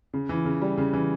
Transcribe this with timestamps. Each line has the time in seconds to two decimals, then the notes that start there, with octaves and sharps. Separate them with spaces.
0.13 C#3
0.29 E3
0.45 C#3
0.62 G3
0.78 C#3
0.93 E3